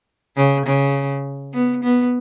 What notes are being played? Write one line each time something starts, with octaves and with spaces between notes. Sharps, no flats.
C#3
C#3
B3
B3